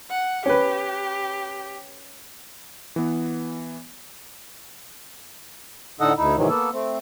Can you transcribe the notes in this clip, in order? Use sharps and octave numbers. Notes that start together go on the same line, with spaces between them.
F#5
C#4 G4 B4
E3 B3
A2 D3 D#4 A4 D#5 F#5
D2 D#4 E4
G#2 C3 D#3 E3 F#3
A#3 B3 A4
A3 C4